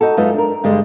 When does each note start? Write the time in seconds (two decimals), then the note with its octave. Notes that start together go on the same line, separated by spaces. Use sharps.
0.01 D#4 F#4 A4
0.17 F#2 G#3 D#4 F4 B4 E5
0.34 D4 A#4
0.64 G2 D3 G3 G#3